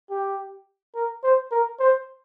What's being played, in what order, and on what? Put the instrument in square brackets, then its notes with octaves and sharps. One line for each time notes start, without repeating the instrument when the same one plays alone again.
[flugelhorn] G4
A#4
C5
A#4
C5